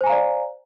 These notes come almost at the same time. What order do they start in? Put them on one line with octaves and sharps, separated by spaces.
C5 G#5 A#5 F5 D5